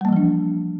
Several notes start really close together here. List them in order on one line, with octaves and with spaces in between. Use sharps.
G3 A#3 E3 F3 D4